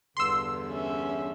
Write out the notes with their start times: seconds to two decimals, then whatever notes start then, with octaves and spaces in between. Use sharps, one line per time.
0.17 E2 G2 D3 C6 E6
0.69 C#4 E5